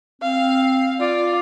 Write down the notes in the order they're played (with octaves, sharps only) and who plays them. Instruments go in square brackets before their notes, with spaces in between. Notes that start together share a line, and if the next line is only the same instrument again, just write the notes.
[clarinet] C4 [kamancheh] F5
[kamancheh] F4 [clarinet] D5